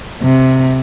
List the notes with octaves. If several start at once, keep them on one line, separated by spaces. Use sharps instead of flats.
C3